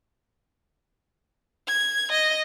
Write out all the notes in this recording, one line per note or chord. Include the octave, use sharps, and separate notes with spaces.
G#6
D#5